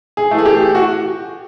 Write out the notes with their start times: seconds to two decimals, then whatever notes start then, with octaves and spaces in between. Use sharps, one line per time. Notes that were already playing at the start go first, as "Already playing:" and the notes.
0.17 G#4
0.31 E3 A3
0.38 G#4
0.46 G4
0.75 F#4